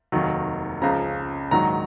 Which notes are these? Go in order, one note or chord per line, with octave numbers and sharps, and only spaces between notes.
F1 D#2 D#3 F#3
C#2 C#3 F3 A#5
A#1 G#2 D#3 F#3 A#5